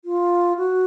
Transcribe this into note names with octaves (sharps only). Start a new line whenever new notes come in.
F4
F#4